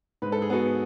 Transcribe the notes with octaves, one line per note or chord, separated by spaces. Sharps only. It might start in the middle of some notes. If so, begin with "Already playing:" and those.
G#2 B4
A4
G#4
B3 F#4 A4